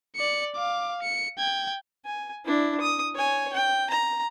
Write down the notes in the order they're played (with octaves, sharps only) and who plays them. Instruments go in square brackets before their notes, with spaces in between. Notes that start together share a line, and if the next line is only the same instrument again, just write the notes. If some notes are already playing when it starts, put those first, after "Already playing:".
[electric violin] D5 C#7
F5 D6
C#7
G5 G#6
[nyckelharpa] G#5
D4 E4
D#6
C#5 G#5
G5
A#5